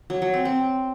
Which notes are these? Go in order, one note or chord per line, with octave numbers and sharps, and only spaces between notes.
F#3
F#3
C4
C4